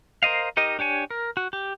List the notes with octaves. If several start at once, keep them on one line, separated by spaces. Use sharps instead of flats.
A#4 C5 D#5 F5
D#4 G4 A#4 D#5
D4 G4 C#5 G#5
A#4
F#4
G4